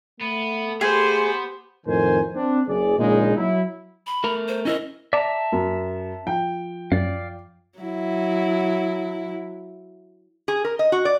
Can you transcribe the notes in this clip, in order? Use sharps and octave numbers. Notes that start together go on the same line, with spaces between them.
A3 B3
B3 G4 G#4 C5
F2 A2 D#3 A#4 C5 G#5
C4 D4
F#1 G#4 D5
A#1 A#2 C#3 G#3 D#4
F#3 E4
B5
A3 A#4 A#5
C5
C#4 E4 A#4 D#5
D5 E5 A5 A#5
F#2
F3 G5
F#2 D5 F5
F#3 E4
G#4
A#4
D#5
F#4
D5